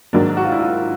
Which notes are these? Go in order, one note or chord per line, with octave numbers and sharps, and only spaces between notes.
G#2 D#3 F#3 A#3 D4
F#4
F4
E4
F4